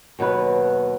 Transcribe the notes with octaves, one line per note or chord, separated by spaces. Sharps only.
D#2 B2 F#3 B4